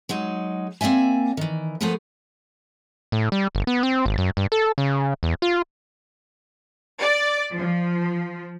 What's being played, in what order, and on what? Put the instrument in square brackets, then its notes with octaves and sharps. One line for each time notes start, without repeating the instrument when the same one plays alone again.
[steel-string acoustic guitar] F#3 G#3 D#4
A#3 C4 D5 E5 G#5
D#3 E3
F3 A3 B3 G#4 A#4 B4
[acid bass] A2
G3
G1
B3
C4
G#1
F#2
G2
A4
C#3
E2
F4
[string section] D5
F3